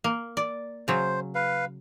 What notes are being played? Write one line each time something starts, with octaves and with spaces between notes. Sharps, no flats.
A#3
D5
C#3 F#3 C5
B4 F5